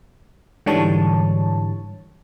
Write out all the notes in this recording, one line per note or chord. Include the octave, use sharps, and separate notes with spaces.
G#2 D3 E3 G3 C#5 A5